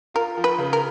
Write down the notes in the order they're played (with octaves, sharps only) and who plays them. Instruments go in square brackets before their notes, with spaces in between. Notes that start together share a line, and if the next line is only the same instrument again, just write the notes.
[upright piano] F4 [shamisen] A#4
[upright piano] F3
[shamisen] B4
[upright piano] C#3
[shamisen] A#4